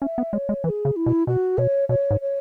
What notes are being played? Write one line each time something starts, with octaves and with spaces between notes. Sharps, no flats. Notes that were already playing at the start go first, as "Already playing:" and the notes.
C#4 E5
B3
G#3 C#5
G#3
E3 B4
G#4
C#3
E4
B2
B2 F#4
B2 C#5
B2 C#5
G#2
C#5